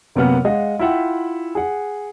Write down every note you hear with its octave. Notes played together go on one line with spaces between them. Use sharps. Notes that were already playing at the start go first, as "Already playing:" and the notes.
F#2 C3 A#3 B3 F#5 F6
G#3 D#5 F5 F#5
E4 F4 E5 F#5 G5
G#4 F#5